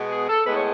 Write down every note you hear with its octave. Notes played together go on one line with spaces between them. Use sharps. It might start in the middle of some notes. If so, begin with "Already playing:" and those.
Already playing: B2 G#3 B3
G#4
A4
A2 G#3 B3 B4
C#5